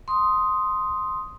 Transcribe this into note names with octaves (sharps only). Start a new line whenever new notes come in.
C6 D#6